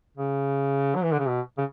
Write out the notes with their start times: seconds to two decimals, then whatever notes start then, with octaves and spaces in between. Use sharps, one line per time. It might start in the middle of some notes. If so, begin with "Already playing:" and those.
0.17 C#3
0.96 F#3
1.03 E3
1.12 D3
1.19 C#3
1.28 B2
1.57 C#3